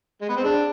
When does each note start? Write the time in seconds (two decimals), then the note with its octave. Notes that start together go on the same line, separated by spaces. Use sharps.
0.21 G#3
0.29 B3
0.37 C4
0.44 D4 G#4